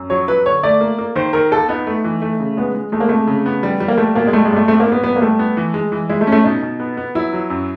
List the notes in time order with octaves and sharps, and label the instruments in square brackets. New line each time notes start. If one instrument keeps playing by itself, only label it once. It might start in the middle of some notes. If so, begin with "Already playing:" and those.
Already playing: [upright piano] F#2
[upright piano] F#3 [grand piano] C#5
[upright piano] F#3 [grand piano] B4
[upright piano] D3 [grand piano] C#5
[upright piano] A3 [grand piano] D5
[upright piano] A#3
A#3
[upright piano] D#3 [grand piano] C5
[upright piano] D#3 [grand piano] A#4
[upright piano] D#2 [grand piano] A4
[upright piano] B3 [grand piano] D#4
[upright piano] A3
E3
A3
C#3
[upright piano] G#3 [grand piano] B3
[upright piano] G#3
[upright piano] G#3 [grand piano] A3
[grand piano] A#3
[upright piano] C3 [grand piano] A3
[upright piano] C#3
B3
G3
G3
[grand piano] A#3
[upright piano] G3 [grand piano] A3
[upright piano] B2 [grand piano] A#3
[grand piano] G#3
[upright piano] G3 [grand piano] A3
[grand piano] G#3
[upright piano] G2
[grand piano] A3
[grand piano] A3 [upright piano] C4
[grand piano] A#3
[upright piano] G#2
[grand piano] B3
[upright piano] G3 [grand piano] B3
[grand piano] A#3
[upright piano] G3 [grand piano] A3
[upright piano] B3
E3
G#3
E3
[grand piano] G#3 [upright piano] E4
[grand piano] A3
[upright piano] C#4
[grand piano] A3
[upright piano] B2 [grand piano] D#4
[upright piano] B2
B3
B3
[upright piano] F#3 [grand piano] E4
[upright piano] F#3
F#2